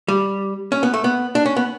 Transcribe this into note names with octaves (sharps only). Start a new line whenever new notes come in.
G3
C#4
B3
A3
B3
D4
C#4
B3